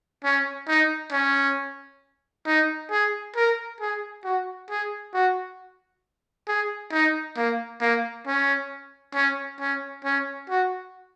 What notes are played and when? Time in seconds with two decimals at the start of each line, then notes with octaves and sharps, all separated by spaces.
0.24 C#4
0.68 D#4
1.12 C#4
2.46 D#4
2.91 G#4
3.36 A#4
3.81 G#4
4.24 F#4
4.70 G#4
5.14 F#4
6.48 G#4
6.93 D#4
7.37 A#3
7.81 A#3
8.27 C#4
9.15 C#4
9.60 C#4
10.05 C#4
10.49 F#4